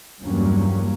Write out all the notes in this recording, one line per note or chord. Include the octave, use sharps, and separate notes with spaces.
E2 G2 F#3 G3 A#3 C#4